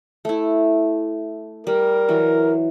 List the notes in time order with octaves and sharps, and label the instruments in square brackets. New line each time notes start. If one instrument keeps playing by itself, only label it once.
[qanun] A3 E4
[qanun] G3 [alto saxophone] A#4
[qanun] E3 F#3